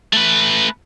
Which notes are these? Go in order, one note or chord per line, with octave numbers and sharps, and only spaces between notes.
A3 B4